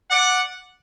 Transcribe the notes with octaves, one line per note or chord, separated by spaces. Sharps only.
D5 F#5